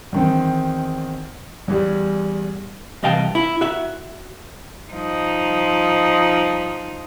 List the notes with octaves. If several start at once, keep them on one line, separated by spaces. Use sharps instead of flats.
E2 D#3 C4
E2 E3 G3
C2 E3 D#5 F5 G5 A5
E4
F#4 E5
F3 D#4